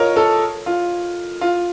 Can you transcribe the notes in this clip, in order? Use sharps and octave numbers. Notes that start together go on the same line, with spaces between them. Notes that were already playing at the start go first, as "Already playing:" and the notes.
Already playing: F4 A#4 C#5 D#5
A4
F4
F4